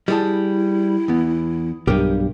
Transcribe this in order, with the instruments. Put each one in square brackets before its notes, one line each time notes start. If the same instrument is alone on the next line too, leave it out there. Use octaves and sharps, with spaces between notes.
[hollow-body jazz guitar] G3 G#4 A5 [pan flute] E4
[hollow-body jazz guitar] E2 B3
[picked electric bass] B1 G2 [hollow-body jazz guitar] G4 A#4